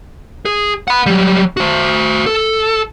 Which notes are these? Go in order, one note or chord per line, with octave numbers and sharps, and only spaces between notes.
G#4
F#5 B5
F#3 G3
F#4 C5
A4